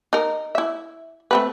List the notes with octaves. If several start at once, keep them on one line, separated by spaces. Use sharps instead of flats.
D#4 A#4
E4 E5
A3 C4 B4